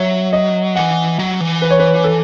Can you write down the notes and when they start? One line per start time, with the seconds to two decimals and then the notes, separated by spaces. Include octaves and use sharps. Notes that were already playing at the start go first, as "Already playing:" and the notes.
Already playing: F#3 C#5 E5
0.33 D#5
0.75 E3 F#5
1.19 F#3
1.40 E3
1.62 B4
1.71 C#5
1.79 B4
2.04 A4